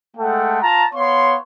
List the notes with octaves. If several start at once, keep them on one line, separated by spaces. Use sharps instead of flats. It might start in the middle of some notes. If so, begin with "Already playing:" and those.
G#3 A3 A4 F#5 G5
F4 A5 A#5
B3 C#5 F5 C6